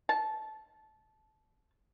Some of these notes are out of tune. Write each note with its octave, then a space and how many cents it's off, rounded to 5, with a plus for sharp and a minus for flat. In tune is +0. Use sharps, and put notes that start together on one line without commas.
A5 -20